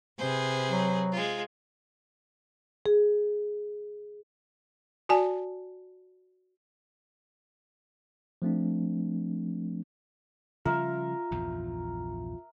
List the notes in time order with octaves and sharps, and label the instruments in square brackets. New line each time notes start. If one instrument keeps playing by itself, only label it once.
[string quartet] C3 G#4 B4 [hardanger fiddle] C5
[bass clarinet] F#3
[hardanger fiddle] G#3 F4
[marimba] G#4
[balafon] F#4 D5 G#5 A5
[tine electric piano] F3 A3 C4 D4
[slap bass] C#3 F3 G3 [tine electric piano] F4 [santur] A#4 E5
[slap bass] A#1 E2 G2